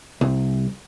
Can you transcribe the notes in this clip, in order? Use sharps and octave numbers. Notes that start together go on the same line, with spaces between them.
C2